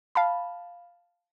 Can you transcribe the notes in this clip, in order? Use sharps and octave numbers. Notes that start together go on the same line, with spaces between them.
F5 A5 B5